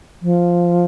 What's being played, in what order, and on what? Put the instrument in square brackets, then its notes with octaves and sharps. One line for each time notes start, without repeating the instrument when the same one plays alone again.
[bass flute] F3